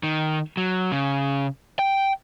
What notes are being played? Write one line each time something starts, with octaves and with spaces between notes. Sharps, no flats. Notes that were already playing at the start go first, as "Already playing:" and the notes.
D#3
F#3
C#3
G5